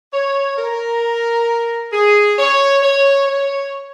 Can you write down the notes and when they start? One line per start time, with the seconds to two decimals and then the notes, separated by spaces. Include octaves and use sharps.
0.12 C#5
0.57 A#4
1.92 G#4
2.37 C#5
2.82 C#5
3.27 C#5